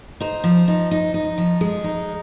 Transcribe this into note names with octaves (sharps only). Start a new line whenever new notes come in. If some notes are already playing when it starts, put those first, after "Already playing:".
D#4 C5
F3
D#4
D#4
D#4
F3
G#3
D#4